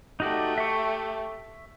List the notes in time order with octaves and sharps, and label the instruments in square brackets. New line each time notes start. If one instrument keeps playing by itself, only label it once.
[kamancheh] A3 G4 [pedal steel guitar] D#4 F#4 D5
[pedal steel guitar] E5 C#6